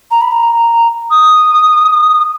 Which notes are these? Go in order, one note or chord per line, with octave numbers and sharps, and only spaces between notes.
A#5
B5
A#5
D#6